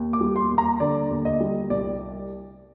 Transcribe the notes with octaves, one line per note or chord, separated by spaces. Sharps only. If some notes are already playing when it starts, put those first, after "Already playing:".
Already playing: D#2
D6
G3
C6
D#2
A#5
D3 D5
D#2
D#5
G3
C2 D5